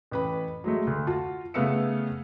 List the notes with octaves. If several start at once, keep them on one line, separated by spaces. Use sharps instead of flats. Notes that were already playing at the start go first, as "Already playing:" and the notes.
A1 B4 B5
F#3 G#3 A3
D2
F4 F#4 A5
C#3 A3 B3 F5 E6 C#7